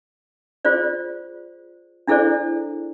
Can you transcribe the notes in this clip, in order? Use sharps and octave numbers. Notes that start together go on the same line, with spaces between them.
F4 G#4 C5 D5
D4 E4 G#4 A4 C5 D5